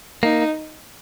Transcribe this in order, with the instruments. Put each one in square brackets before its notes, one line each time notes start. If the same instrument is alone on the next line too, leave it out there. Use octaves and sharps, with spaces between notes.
[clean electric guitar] A#3 [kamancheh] D#4